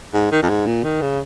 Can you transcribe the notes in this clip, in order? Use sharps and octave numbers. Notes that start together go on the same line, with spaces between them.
G#2
D#3
F2
G#2
A#2
D#3
C#3